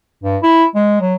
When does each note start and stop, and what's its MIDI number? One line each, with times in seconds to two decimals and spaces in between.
0.23 0.37 43
0.43 0.65 64
0.75 1.00 56
1.01 1.15 54